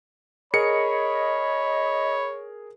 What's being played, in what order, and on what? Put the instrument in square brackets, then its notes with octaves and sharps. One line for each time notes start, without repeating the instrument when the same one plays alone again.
[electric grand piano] G#4 A#4 C#7 [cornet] C#5 [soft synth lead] D#5 [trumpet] B5